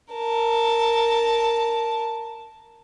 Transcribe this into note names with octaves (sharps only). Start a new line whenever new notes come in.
A#4 A5